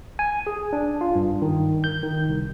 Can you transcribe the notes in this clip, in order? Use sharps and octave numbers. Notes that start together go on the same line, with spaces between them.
G#5
G#4
D4
F4
G2
D#3
G6
D#3
C2